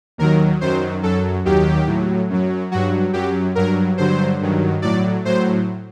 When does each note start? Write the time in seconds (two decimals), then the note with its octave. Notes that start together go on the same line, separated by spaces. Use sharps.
0.18 D#2 D#3 F#3 A#4
0.61 F#2 D#3 F#3 C5
1.03 F#2 F#3 A4
1.45 D#2 D#3 F#3 G4
1.87 A2 F#3
2.30 F#2 F#3
2.71 G2 F#3 F#4
3.13 F#2 F#3 G4
3.55 G2 F#3 A#4
3.98 G2 D3 F#3 C5
4.41 G2 D#3 F#3
4.82 A2 F#3 D5
5.25 A2 F#3 C5